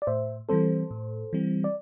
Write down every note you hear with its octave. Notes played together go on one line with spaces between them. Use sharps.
D5
A2 C5 E5
E3 G3 C4 A4 C5
A2
E3 G3 C4
D5